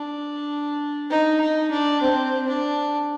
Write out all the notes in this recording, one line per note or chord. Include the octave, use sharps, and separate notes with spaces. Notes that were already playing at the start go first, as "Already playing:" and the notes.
Already playing: D4
D#4
D#4
D4
C4
D4